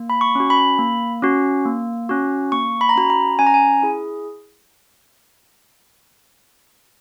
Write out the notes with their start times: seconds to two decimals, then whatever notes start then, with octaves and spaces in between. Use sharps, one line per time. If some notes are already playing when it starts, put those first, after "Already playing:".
Already playing: A#3
0.10 B5
0.21 C#6
0.35 C#4 F#4
0.50 B5
0.79 A#3
1.22 C#4 F#4
1.65 A#3
2.09 C#4 F#4
2.52 A#3 C#6
2.81 B5
2.89 A#5
2.96 C#4 F#4 B5
3.10 A#5
3.39 C#4 G#5
3.47 A#5
3.54 G#5
3.83 E4 G#4